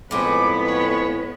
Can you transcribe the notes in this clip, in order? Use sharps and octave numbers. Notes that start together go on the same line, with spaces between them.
F2 A2 G#3 B3 B4 D6
C#5